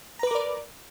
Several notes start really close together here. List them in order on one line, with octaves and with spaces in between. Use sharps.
A#5 B4 D6 A#4 D5